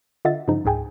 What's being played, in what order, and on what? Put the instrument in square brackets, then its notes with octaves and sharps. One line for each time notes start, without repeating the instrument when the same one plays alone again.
[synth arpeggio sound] D3 F4 D#5 E5 F#5 A6
G2 C#3 F3 D#4
C#2 G#2 G#4 G5 G#5